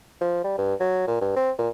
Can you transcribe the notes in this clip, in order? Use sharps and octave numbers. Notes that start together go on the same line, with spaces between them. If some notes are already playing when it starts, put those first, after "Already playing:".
F3
G3
G2
F#3
A#2
G2
C4
A#2